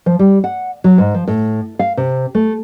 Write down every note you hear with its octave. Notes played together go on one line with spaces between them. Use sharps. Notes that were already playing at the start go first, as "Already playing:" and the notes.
F3
G3
F#5
F#3
G#2
F3
A2
F5
C3
A3